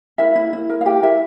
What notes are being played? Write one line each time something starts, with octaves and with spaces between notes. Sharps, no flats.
E4 A#4 E5
E4
E4
A#4
F5
E4 G4 G5
E4 A#4 E5